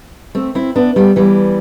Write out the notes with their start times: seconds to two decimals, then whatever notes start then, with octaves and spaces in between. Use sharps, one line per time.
0.35 A3 C4
0.55 C4 E4
0.76 B3 D4
0.96 G3 B3
1.16 E3 G3